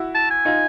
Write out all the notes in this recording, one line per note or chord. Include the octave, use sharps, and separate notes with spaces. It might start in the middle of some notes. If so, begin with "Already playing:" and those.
Already playing: E4 F#4
A5
G#5
D#4 F4